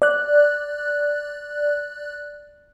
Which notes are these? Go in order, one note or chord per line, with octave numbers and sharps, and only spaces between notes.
D5 F#6